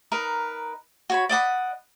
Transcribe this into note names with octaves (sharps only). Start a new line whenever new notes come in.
D#4 A#4 B4
F#4 C#5 B5
D5 D#5 F#5 B5